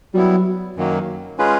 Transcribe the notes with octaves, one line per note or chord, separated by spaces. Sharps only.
F#3 G3 B3 E4
F#2 D#3 F#3 A#3
G#3 C#4 F4 G#4 B4